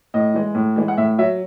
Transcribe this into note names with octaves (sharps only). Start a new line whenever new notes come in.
A2 D#5
E3 G#3
A2
E3 G#3
F#5
A2 E5
F#3 E5